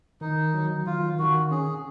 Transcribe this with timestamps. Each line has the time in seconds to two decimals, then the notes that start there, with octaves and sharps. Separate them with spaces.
0.21 D#3 D#4
0.54 F#3
0.86 D#3 F4
1.19 D#3 F#4
1.51 C#4 G#4